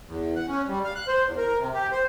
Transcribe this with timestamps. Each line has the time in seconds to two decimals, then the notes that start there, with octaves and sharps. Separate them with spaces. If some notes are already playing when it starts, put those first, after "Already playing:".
0.07 E2
0.36 F#5
0.48 C#4
0.67 G3
0.84 F5
0.96 F#6
1.08 C5
1.24 E2
1.37 A#4
1.58 C3
1.74 G4
1.92 C5